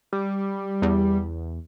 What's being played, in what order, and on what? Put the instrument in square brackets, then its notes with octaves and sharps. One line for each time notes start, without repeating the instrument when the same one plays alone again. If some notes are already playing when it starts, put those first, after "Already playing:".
[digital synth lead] G3
[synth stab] E2